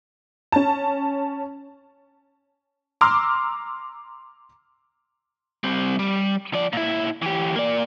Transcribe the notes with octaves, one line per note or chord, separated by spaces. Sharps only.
C#4 A5
A#5 C6 D6 E6 F6
G3 C4
G3
F3 D5
A#2 E4
E3 G4
A#3 D5